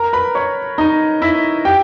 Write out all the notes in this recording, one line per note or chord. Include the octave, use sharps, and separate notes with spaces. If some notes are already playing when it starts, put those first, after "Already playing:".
Already playing: A#4 A#5
B4 B5
C#5 C#6
D#4 D#5
E4 E5
G4 G5